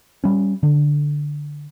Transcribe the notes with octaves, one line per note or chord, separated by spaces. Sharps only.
G3 C#4
D3